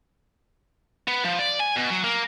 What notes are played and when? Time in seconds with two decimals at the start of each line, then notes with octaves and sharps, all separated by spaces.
1.08 B3
1.25 F3
1.39 D5
1.60 G#5
1.77 B2
1.90 F#3
2.04 A#3